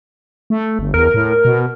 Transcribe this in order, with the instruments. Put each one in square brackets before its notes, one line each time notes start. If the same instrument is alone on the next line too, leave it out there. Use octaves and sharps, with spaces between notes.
[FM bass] A3
G1
[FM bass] E2 [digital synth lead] A#4
[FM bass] A2
B2